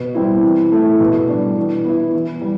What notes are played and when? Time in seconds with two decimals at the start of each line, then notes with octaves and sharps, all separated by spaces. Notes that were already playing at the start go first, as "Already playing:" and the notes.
Already playing: B2
0.15 G3 C4 E4
0.43 E3
0.72 A3 E4
1.00 B2
1.29 G3 D4
1.57 E3
1.85 B3 E4
2.13 E3
2.41 G3